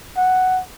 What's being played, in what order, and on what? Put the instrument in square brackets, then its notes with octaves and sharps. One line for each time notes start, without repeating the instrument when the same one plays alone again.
[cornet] F#5